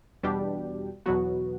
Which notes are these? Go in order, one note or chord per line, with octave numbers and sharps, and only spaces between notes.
E2 B2 G3 D4 G4
E2 B2 F#3 B3 F#4